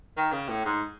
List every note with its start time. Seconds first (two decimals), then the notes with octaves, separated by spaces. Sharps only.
0.17 D#3
0.32 C#3
0.48 A2
0.65 G#2